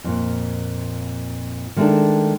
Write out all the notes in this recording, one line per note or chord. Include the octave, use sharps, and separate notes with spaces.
F2 A#2
D#3 G#3 A3 B3 D4 A4